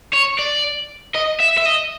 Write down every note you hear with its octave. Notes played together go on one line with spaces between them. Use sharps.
C#5
D5
D#5
E5
E5
D#5